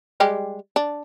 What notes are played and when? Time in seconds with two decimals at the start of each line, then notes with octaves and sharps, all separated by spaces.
0.20 G3 G#3 G4
0.76 D4